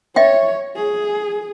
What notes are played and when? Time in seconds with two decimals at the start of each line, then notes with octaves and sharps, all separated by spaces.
0.16 C#5 D#5 E5 G5
0.76 G#4